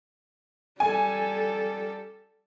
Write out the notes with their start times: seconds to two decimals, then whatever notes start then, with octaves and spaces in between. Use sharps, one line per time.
0.80 G3 A4 G#5